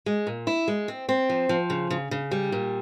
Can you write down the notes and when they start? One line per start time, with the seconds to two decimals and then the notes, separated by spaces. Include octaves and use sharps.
0.06 G#3
0.27 A#2
0.47 E4
0.68 G#3
0.88 C4
1.09 C4
1.29 F3
1.49 F3
1.70 C#3
1.90 C#3
2.11 C#3
2.31 G3
2.52 A#2